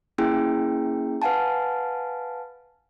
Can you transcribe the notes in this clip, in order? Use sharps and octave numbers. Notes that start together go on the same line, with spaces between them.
A#3 C#4 E4 G#4 G5
B4 F5 F#5 G#5 A5